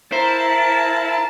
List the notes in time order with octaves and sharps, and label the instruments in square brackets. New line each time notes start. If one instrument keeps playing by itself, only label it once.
[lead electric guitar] E4 [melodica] A#4 F5 A#5 [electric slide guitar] C5 [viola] A5